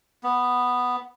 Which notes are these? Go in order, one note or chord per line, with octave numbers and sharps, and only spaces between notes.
B3